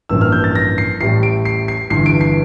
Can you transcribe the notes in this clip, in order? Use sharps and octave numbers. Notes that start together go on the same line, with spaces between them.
A1 G2 F3 A#3 E6
F6
G6
A6
A#6
C7
A1 A2 G3 C7
D7
C7
C7
G1 G2 E3 C7
D7
C7